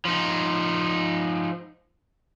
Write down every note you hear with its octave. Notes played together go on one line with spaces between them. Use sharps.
F3 D#4